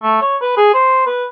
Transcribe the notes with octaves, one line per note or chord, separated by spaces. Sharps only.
A3
C#5
B4
G#4
C5
B4